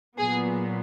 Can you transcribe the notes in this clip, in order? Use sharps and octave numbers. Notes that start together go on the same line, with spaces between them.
A#2 F#3 B3 G#4